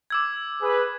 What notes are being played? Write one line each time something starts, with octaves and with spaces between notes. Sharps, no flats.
D6 E6 G#6
G#4 B4